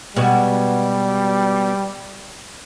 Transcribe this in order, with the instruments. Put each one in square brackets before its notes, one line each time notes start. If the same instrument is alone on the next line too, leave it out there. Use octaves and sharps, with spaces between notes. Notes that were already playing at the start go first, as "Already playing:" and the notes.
[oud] B2 G#3 F#4 [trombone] G3